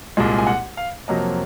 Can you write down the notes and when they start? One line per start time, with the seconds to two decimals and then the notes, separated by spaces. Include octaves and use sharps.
0.17 C2 A#2 G#3
0.39 G#5
0.47 F#5
0.77 F5
1.08 F2 C3 F#3 A#3 D#5